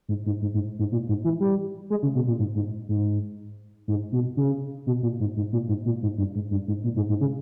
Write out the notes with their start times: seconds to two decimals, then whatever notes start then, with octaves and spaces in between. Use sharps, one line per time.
0.08 G#2
0.26 G#2
0.42 G#2
0.54 G#2
0.79 G#2
0.92 A#2
1.08 G#2
1.24 E3
1.40 G3
1.90 G#3
2.03 C#3
2.15 B2
2.28 A#2
2.39 G#2
2.56 G#2
2.89 G#2
3.88 G#2
4.12 B2
4.37 C#3
4.87 B2
5.03 A#2
5.20 G#2
5.37 G#2
5.53 A#2
5.68 G#2
5.86 A#2
6.03 G#2
6.18 G2
6.35 G#2
6.51 G2
6.68 G#2
6.84 A#2
6.96 G#2
7.09 G#2
7.21 C#3